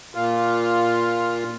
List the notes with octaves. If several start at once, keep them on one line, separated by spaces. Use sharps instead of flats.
A#2 F4